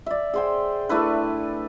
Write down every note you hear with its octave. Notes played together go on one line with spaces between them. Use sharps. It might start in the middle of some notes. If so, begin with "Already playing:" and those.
D5 E5
G#4 C5 G5
A3 D4 E4 B4